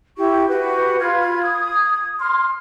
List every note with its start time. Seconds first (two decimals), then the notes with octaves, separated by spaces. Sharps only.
0.17 E4 G4 C#6
0.48 F#4 G4 B4
0.99 F4 B5 F6 G#6
1.42 D#6 G#6
2.19 C6 F6